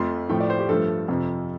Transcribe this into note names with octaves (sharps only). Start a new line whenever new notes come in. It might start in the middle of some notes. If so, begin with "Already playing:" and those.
Already playing: F2 F3 A3 C6
A2 F3 A3 G5
D5
C5
G4
G2 F3 A3 A4
F2 C3 F3